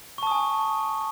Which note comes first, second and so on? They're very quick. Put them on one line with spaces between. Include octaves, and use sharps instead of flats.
C#6 A5 D#6 G#5